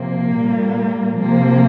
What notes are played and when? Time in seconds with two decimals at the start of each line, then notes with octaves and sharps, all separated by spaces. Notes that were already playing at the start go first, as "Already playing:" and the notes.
Already playing: C3 F3 A#3
0.33 A#2 G3
1.17 C3 F3 A#3